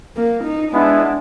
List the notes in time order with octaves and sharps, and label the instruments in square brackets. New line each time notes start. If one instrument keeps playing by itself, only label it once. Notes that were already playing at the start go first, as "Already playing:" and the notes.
[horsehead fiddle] A#3
D#4
[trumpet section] G#3 B3 E4 [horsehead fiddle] D4